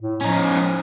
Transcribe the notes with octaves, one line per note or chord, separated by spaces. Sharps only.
A2
F3 C#4 D#4